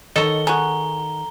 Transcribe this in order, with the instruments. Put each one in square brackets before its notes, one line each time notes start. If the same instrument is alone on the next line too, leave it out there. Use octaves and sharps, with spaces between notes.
[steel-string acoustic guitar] D#3 F#5 [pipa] D#4 C#5 D#5 [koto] A4 [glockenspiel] G7
[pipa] F#4 G#4 [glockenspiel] A#5